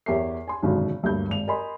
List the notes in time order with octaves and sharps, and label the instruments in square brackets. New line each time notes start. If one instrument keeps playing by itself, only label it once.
[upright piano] E2 G4 A#4 C#5 E5 C7
G#5 C6
G#1 F#2 B2 D3 D#3
D2 G2 A#3 C#5 G6
G#1 F7
A#4 D#5 G#5 B5 C6